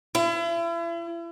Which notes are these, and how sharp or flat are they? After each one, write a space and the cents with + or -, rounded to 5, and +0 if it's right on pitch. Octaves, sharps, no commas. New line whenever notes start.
E4 +40